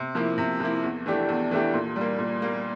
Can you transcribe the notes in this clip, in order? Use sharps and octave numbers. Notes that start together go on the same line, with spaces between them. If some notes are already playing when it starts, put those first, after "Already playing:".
Already playing: C3
F3 A#3 E4
C3
F3 A#3 E4
E2
E3 A3 D4 G4
E2
E3 A3 D4 G4
A#2
G3 A#3
A#2
G3 A#3